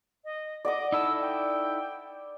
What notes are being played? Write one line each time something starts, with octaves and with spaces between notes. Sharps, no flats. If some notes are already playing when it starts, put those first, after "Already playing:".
D#5
D5 D#5 F#5 D6
D#4 E4 A4 E6
G5